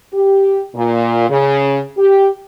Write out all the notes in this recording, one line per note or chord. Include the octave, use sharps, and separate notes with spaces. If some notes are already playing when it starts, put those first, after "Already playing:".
G4
A#2
C#3
G4